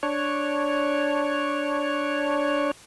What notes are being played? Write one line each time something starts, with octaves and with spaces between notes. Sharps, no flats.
D4 C#5